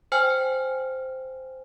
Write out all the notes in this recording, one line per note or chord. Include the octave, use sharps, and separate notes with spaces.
C5 G5 G#5 F6